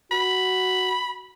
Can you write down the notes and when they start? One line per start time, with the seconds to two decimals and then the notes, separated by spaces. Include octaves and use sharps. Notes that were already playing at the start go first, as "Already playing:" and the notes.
0.12 F#4 B5